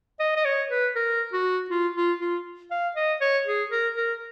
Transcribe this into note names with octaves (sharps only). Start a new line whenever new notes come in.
D#5
D#5
C#5
B4
A#4
F#4
F4
F4
F4
F5
D#5
C#5
G#4
A#4
A#4